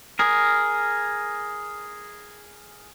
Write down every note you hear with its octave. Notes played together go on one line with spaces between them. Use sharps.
G#4 A#4